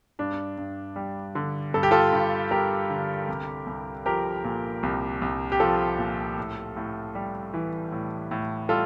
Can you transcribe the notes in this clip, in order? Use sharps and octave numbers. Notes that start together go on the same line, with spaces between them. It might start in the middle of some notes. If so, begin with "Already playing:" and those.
G2 D4
G2
G3
D3
G2 A4
G4
F4 A4
G2
G3 G4 A#4
D3
C2
C2
F3 G4 A#4
A#2
C2
C2
G4
F3 F4 A4
A#2
A2
A2
G3
E3
A2
A2
G3 F4 A4